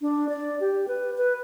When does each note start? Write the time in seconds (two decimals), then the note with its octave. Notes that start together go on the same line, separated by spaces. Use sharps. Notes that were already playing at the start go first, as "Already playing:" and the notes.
0.01 D4
0.29 D5
0.60 G4
0.88 B4
1.18 B4